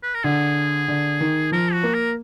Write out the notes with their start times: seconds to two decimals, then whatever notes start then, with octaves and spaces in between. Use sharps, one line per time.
0.03 B4
0.14 A#4
0.24 D3 G#4
0.88 D3
1.20 D#3
1.52 F3 A#4
1.73 F#4
1.83 A#3
1.94 A#4